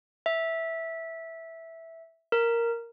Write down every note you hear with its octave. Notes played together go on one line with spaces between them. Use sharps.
E5
A#4